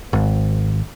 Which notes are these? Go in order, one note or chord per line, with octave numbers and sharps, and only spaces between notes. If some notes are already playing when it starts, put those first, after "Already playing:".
G#1